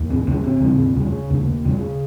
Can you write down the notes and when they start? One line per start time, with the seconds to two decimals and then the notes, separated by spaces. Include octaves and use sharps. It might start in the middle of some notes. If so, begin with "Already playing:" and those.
Already playing: D#2
0.10 C4
0.27 C#3 C#4
0.44 C4
0.61 D#2
0.96 C#3
1.30 D#2
1.65 C#3